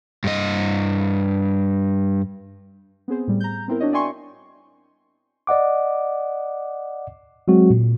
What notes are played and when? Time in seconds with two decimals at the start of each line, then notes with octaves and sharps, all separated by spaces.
0.24 G2 D#5
3.08 B3 C4 G#4 C5
3.28 A2 G3
3.40 A#5 G6
3.68 B3 C4 E4 A#4
3.80 D4 F#4 C#5 D#5
3.93 D5 E5 G5 G#5 C6 C#6
5.47 D5 D#5 F#5 D6
7.48 F#3 G#3 C4 F#4
7.70 A#2